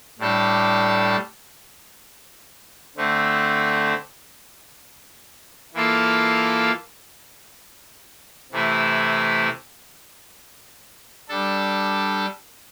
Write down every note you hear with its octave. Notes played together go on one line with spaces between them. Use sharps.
A2 G3 D4 A4
D3 A3 C4
E3 A#3 F4 A4
C3 E3 A3 E4
G3 D4 A4